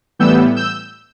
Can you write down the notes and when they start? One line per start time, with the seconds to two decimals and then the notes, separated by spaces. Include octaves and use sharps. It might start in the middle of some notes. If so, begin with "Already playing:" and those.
0.19 A2 E3 G3 B3 E6 G6
0.56 E6 G6